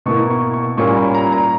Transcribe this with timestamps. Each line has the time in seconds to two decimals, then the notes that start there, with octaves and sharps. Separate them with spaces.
0.06 B2 A#3 E4 C#6
0.30 C#6
0.53 C#6
0.77 A#2 G3 A#3 C#4 C#6
0.96 B5
1.14 A#5
1.32 A#5